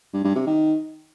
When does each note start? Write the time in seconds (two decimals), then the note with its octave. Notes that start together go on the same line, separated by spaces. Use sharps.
0.13 G2
0.24 G2
0.35 C3
0.46 D#3